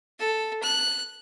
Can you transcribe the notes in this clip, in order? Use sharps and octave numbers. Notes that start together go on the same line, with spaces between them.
A4
F#6